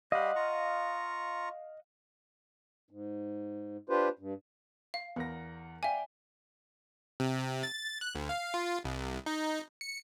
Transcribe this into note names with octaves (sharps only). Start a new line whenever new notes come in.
G3 G4 D#5 F5 F#5 C6
F4 A#5 C#6
G#2
D4 F4 G4 B4 C5
G2
F5
E2 B3 A#4 A#6
D5 E5 F5 G5 G#5
C3
A6
F#6
D2
F5
F4
C2
D#4
C#7